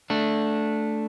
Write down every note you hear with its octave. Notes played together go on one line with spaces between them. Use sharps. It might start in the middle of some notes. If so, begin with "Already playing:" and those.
A3 D4